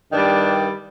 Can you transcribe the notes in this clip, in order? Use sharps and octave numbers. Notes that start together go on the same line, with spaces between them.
G2 D#3 G3 D4